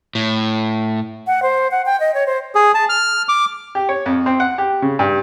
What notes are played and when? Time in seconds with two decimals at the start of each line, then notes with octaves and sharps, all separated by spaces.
0.15 A2
1.26 F#5
1.42 C5
1.71 F#5
1.86 G5
2.00 D#5
2.14 C#5
2.26 C5
2.55 G#4
2.75 A5
2.89 F6
3.29 D6
3.75 G4
3.89 C#5
4.06 F2
4.26 C4
4.40 F#5
4.58 G4
4.82 C#3
4.99 G2